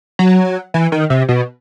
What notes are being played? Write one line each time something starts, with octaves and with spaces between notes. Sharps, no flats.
F#3
E3
D#3
C3
B2